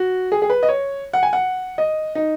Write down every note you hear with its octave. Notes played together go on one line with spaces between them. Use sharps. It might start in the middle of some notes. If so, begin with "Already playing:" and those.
Already playing: F#4
G#4
G#4
B4
D#5
C#5
F#5
G#5
F#5
D#5
D#4